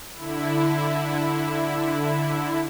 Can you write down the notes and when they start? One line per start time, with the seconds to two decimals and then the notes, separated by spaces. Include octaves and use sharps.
0.14 D3 E4